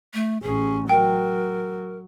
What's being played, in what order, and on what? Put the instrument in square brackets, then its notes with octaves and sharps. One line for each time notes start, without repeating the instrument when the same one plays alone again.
[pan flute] A3
[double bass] A1 C#4 [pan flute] G#4
[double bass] F#3 [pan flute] A#4 [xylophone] G5